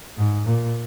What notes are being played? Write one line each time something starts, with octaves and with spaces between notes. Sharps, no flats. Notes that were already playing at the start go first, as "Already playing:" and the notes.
G#2
A#2